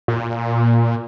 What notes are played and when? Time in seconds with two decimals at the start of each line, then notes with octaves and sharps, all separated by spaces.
0.08 A#2